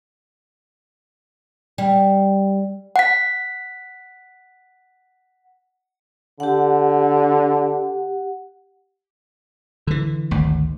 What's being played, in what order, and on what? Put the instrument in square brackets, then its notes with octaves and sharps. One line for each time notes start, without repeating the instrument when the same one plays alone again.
[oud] G3
[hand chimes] F#5 B6
[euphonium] D3 [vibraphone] G4 F#5
[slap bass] D3 E3
G#1 D2